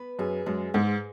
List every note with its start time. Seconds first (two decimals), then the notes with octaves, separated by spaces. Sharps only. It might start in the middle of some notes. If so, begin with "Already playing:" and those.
Already playing: B3 B4
0.19 F#2 G#4
0.46 F#2 G#3
0.74 G#2 G#3